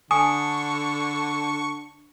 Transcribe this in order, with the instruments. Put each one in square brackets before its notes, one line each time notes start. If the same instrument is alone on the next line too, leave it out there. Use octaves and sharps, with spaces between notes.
[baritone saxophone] D3 [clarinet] D4 [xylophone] G#5 D#6 [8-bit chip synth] C#6